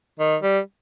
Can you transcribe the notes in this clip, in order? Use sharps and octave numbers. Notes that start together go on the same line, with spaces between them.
D#3
G3